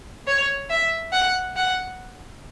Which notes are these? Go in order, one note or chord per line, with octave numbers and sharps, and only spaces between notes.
C#5
E5
F#5
F#5